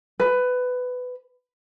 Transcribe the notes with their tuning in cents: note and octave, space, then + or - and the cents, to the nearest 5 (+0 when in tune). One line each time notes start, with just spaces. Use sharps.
B4 +15